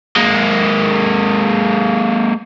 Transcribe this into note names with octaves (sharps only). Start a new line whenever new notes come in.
G#3 A#3